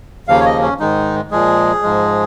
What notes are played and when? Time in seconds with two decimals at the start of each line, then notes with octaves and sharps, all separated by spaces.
0.27 D#2 C#3 F3 A#3 F5
0.41 C#5
0.46 D#5
0.62 C#4
0.79 G#2 D#3 G#3 D#4
1.31 A#2 F3 G#3 G#4
1.82 G#2 F3 G#3